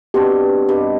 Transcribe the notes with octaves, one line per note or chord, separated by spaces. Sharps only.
B2 C4 D4 G4
G2 G3 D#5